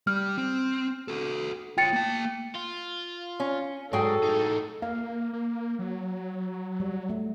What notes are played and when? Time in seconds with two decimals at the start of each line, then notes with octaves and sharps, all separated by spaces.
0.07 G3 F6
0.38 C4
1.08 F#4 A4
1.78 F4 C#5 G5 A6 C#7
1.93 A#3 A5
2.55 F4
3.40 C#4
3.93 G#2 F#3 G#4 A4 G5
4.23 A2 D#4
4.82 A#3 F5
5.33 A#3
5.79 F#3
6.80 G3
7.09 A3